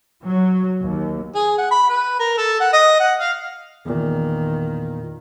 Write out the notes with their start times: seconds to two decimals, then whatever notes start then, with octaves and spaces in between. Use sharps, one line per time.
0.24 F#3
0.81 D#2
1.35 G#4
1.58 F#5
1.71 B5
1.89 B4
2.20 A#4
2.38 A4
2.60 F#5
2.73 D#5
3.00 F#5
3.20 F5
3.86 E2 A#2 D#3